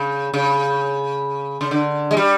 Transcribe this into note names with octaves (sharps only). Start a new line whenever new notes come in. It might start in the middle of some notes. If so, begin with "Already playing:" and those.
Already playing: C#3
C#3
C#3
D3
G#3
G3